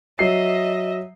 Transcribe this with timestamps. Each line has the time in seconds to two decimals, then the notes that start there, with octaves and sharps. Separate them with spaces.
0.19 F#3 D#5 E5 C7